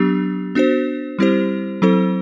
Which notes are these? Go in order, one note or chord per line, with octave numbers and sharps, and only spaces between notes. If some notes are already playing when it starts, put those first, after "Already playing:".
Already playing: F#3 B3 D4 G4
B3 D4 F#4 C5
G3 C4 E4 G4 C5
F#3 C4 E4 A4 C5